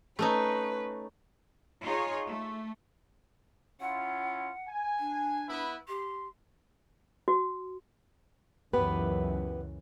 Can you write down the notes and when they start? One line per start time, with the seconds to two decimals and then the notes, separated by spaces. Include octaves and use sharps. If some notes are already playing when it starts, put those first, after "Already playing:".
0.19 A3 C#4 D#4 B4
1.82 D#4 F4 G#4 C#5
2.26 A3
3.81 C#4 E4 F4 F#5
4.67 G#5
4.99 D4
5.49 B3 E4 B4
5.88 G4 C6
7.28 F#4
8.73 C#2 F#2 E3 B3 G4 B4